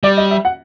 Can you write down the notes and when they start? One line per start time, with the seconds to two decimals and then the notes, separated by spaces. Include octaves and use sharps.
0.03 G3 D5
0.17 D#5
0.31 E5
0.45 F#5